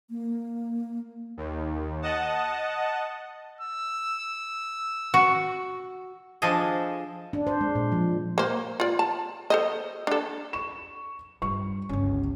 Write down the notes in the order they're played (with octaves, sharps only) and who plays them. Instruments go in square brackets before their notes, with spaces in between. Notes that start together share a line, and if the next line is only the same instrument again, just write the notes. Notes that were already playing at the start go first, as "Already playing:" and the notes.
[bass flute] A#3
[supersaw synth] D#2
D#5 F#5 A5
[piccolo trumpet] E6
[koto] F#4
F3 D4 G#4 A4 D#5
[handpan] D4
C5
G#3
A#2
F3
[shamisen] A#3 C5
F4 D5
A5
A4 C5 D#5
D4 A4
[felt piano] C#6 E7
[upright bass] G2 G3 [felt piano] C#6
[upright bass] G1 C#2 [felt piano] C#4